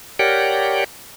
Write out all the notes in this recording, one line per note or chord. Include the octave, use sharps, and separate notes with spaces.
G4 A#4 C#5 D5 F#5 G5